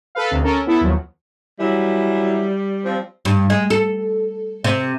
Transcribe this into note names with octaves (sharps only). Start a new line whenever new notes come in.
A4 B4 F5
D2 C3
C#4 A4 A#4
B3 E4 A4
D#2 F3 F#3
E3 F#3 G3 E4
F3 C4
G2
G#3
A4
C3